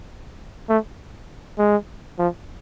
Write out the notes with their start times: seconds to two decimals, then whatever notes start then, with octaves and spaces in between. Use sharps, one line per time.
0.69 A3
1.59 G#3
2.19 F3